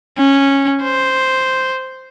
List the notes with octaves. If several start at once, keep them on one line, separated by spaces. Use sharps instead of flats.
C#4
C5